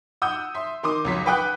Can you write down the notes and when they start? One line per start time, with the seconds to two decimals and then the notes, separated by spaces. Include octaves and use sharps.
0.22 F#5 D#6 E6 G6
0.55 E5 C6
0.83 D#3 C6 D6 D#6
1.05 C#2 F#3 B6
1.26 B4 F#5 G5 B5 D#6 F#6